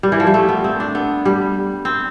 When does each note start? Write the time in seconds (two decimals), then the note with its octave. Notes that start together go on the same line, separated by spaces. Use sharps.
0.03 G3
0.12 E3
0.20 F3
0.27 G3
0.34 A3
0.49 B3
0.64 C4
0.80 D4
0.95 B3
1.25 G3
1.85 C4